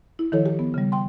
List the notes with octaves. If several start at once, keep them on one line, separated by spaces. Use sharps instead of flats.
E4
D#3 F3 E4 A4 C#5
G4
B3
C#3 G3
G5 C6